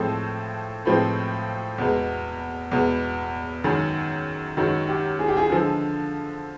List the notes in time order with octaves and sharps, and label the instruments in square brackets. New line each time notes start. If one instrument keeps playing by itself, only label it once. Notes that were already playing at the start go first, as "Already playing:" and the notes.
Already playing: [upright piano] A2 F3 G#3 C4 [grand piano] A4
[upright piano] A2 F3 G#3 C4
E2 B2 G#3
E2 B2 G#3
[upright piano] F#2 D#3 G#3 [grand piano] G#4
[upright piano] F#2 D#3 G#3 [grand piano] F#4
[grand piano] G4
G#4
G4
G#4
[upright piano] D3 F3 G#3 [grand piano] A4